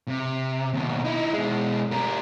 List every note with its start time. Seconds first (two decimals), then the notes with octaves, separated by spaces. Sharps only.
0.08 C3
0.73 D#2 B2
1.04 D#4 E4
1.33 B2 G#3
1.91 G3 A#4